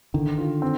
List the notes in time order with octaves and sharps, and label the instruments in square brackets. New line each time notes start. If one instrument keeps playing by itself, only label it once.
[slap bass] D3 [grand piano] D#3
[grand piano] F4
C4